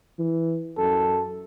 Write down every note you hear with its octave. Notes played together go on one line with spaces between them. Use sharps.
E3
F#2 A4